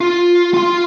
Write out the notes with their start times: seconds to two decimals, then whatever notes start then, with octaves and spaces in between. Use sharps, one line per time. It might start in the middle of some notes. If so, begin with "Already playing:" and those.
0.01 F4
0.54 F4 C6